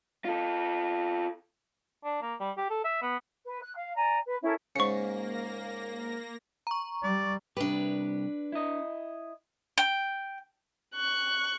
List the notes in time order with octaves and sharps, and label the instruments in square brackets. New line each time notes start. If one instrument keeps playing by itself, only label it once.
[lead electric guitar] F4 A4
[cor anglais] D4
A#3
G3
G4
A4
E5
B3
[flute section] B4
F#6
F5
D5 G#5 A#5
B4
C#4 E4 A4 A#4
[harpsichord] G#2 C#3 [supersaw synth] A#3 A#6 [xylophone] C#6 C#7
[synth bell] A#5 C#6
[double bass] G3 [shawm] D5
[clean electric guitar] C2 G4 [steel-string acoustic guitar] D4 B4
[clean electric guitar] E4 D#5
[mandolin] G5
[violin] C#6 F#6